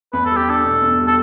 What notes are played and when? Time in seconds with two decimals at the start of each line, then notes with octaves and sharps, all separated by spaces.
0.13 E2 B4
0.26 G3 A4
0.37 G4
0.48 D4 A4
0.65 B2
0.82 E2
1.00 G3
1.07 A4